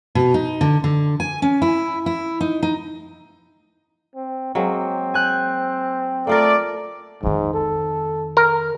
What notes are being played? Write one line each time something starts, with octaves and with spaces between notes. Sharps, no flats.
B2
D#4
D3
D3
G#5
C#4
E4
E4
D#4
D#4
C4
F#3 G#3 A#3 C4
G#5 F#6 G6
A3 A#3 F4 A#4 D5
F2 G#2 D#3
A4
A#4